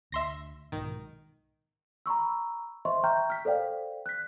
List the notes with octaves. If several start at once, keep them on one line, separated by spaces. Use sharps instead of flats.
D2 E5 C6 A#6
B1 G#2 B2 D#3
A#5 B5 C#6 E6
C5 D#5 E5 C6 C#6
E5 G5 A#5 C#6 F6 G6
F6 B6
A4 C5 D5 F5 G5
F#6 B6